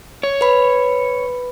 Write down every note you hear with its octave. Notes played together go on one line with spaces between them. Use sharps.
C#5
B4 B5